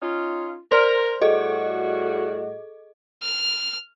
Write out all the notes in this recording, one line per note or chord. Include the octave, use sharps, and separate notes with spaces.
C#4 D#4 F4
A#4 C5 D5 C6
A2 G3 F#4 G#4 A4 D#5
F6